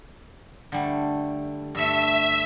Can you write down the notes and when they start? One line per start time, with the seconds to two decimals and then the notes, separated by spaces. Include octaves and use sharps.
0.72 D3 G3 A3
1.75 G2 A3 E5